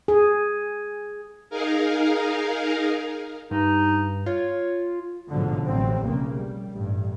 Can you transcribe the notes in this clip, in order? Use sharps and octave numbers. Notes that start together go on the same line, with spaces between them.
G#4
D#4 G#4 A#4 F5
G2 D#4
F4 C#5
A1 G#2 B2 D3 F3 F#3
A1 G2 F#3 G3 C4
F1 B1 C#3 A#3
G3
A1 G2